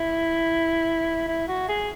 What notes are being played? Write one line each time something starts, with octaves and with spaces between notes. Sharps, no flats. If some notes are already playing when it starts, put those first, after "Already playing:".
Already playing: E4
E4
F#4
G#4